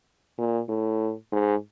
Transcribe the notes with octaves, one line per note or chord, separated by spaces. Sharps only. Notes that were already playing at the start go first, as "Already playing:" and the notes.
A#2
A2
G#2